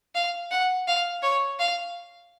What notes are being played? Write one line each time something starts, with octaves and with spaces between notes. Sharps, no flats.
F5
F#5
F5
C#5
F5